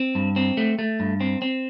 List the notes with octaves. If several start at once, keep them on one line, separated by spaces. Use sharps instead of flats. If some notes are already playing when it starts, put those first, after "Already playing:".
Already playing: C4
G2
C4
A3
A3
G2
C4
C4